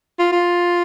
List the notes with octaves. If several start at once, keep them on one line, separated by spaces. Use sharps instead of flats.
F4
F4